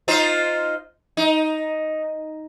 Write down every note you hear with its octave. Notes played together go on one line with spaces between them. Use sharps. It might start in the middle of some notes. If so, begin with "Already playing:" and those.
D#4 F4 C5
D#4